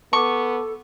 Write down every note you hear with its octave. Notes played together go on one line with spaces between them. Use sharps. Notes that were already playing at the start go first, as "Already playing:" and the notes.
B3 A4 A5 C#6 D6